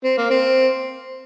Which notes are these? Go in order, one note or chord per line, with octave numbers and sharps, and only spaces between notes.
C4
A#3
C4